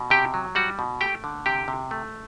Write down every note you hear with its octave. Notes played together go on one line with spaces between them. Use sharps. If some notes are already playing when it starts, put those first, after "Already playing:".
Already playing: B2
C3 G4 G5
F#3
G3 F#4 F#5
B2
A3 G4 G5
D3
C3 G4 G5
C3
A3